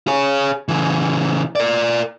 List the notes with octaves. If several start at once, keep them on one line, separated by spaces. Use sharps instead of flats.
G#4 C#5
C#3 E3
A#4 D5